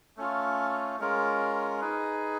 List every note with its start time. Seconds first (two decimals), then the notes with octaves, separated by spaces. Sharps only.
0.17 A3 C#4 F4
0.99 G#3 C#4 F4 A#4
1.81 D#4 G#4 B4